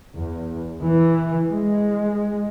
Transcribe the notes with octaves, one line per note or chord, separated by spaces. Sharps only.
E2
E3
G#3